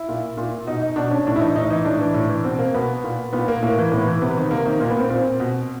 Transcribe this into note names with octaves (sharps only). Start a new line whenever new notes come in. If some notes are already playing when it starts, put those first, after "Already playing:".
Already playing: E4
A#2
A#2
B2 D#4
D#4
B2 D4
C#4
A2 D4
E4
E3 D#4
A2 D#4
E3 D#4
A2 D4
E3
A2
E3
B2 C4
A#3
B2 B3
A#2
A#2 B3
A#3
A2 A#3
E3
A2 B3
E3
C3 B3
D#3
C3 A#3
D#3
A#2 A#3
B3
C4
A#2
B2